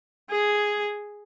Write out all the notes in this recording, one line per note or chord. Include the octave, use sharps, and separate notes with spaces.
G#4